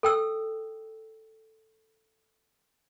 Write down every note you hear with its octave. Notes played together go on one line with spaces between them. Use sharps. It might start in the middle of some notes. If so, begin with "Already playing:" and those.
A4 G5 E6